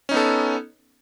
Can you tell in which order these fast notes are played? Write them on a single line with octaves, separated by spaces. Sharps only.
C#4 D#4 B3 A4